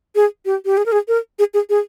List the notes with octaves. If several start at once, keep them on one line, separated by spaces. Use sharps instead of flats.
G#4
G4
G4
G#4
A#4
G#4
A#4
G#4
G#4
G#4